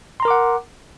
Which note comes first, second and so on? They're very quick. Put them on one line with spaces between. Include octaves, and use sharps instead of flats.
C6 A#5 A#4 D6 F#5